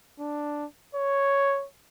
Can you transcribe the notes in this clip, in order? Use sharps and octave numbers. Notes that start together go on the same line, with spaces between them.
D4
C#5